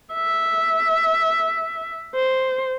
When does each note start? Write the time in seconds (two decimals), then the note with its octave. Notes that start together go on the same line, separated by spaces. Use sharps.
0.14 E5
2.15 C5